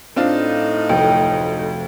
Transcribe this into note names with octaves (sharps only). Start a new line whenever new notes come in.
A2 C4 D4 D#4 F4
F1 D2 G5